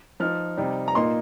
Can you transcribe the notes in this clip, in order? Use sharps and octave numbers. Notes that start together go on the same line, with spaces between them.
F3 D#4 F6
C3 G3 D#4
A#5
A#2 A#3 D#4 C6